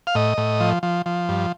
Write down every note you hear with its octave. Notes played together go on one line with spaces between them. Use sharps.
F5
A2 D#5
A2
F3
F3
F3
G2